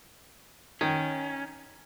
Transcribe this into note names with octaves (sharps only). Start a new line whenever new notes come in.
D#3 C#4